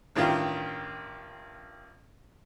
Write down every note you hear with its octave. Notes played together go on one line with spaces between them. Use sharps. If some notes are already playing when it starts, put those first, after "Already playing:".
A1 G2 D#3 F4